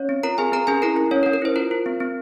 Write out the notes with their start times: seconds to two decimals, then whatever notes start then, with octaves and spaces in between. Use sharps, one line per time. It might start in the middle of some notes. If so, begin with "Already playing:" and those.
Already playing: C#4 C#5
0.09 C4
0.23 F4 A#4 A#5
0.38 C4 G#4 G#5
0.52 C4 A#4 A#5
0.67 C#4 G#4 G#5
0.82 E4 A#4 A#5
0.96 E4
1.11 C#4 C#5
1.23 A#4
1.26 C#4
1.33 A#4
1.42 E4 C5
1.56 F4 A#4
1.71 F4
1.86 C4
2.00 C4